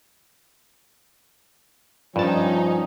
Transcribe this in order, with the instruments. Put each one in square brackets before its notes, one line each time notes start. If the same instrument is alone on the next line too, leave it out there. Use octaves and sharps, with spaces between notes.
[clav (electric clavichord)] G2 A5 [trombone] F3 [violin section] C#4 D#4